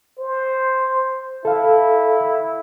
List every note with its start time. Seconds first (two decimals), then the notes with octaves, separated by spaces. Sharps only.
0.19 C5
1.45 E4 A4 F5